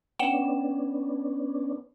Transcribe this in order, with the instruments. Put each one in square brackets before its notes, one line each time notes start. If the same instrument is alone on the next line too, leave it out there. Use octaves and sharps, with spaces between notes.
[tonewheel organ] B3 C#4 D4 [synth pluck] F#5 G5 E7